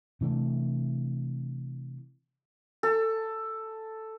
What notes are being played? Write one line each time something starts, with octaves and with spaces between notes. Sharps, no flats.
C3 E3 A3 D4
A4